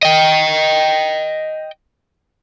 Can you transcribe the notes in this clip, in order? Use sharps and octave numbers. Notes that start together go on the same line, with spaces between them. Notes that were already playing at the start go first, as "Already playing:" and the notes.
D#5 G5